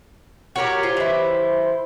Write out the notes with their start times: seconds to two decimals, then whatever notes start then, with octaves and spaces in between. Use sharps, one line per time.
0.56 F#4 G4 A#4 C#5
0.83 F4 C5
0.97 E3 E4